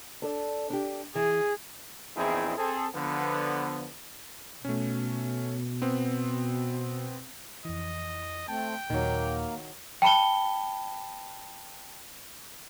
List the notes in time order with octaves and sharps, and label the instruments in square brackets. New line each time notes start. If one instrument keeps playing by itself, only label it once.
[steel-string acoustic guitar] D4 A4 D5
D4 G4
[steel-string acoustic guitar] E3 [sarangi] G#4
[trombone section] A#1 E2 C4 D#4 E4 G#4
C4 G#4 A4
D3 F3 B3
[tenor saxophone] B2 [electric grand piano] A3 C#4
[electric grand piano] B3 C4
[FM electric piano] F2 E3 [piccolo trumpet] D#5
[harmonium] A3 C4 [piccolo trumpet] G5 [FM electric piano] A5
[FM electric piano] D#2 A#2 [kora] D#3 F#3 [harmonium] A#3
[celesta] G5 A5 B5 C#7 G7